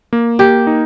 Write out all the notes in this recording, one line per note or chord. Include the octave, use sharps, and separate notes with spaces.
A#3
A#3 G4
D#4